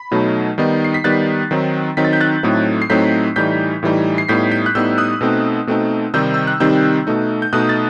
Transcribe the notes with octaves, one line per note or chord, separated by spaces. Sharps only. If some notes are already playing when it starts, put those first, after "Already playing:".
Already playing: B5
B2 F#3 A3 D#4
D#3 G3 B3 D#4
C7
B6
D#3 G3 B3 D#4 F#6 A6
D#3 F#3 C4 D#4
D#3 F#3 C4 D#4 B6
A6
G6
F#6 A6
A2 F#3 A3 C4 D#4
C7
A2 F#3 A3 C4 D#4 G6 B6
A2 E3 G3 D#4 G6 B6
A2 E3 G3 D#4
C7
A2 G3 B3 D#4 G6 B6
G6 B6
F#6
A2 G3 B3 D#4 E6 G6
D#6 F#6
B2 A3 C4 D#4
B2 A3 C4 D#4
C3 D#3 G3 C4 D#4 E6 G6
E6
F#6
C3 D#3 G3 C4 D#4 E6 G6
B2 A3 D#4
G6
B2 A3 D#4 D#6 F#6
A6